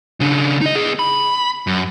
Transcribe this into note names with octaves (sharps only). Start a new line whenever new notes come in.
C#3 D4
D#4 D#5
B3 G#4
B5
F#2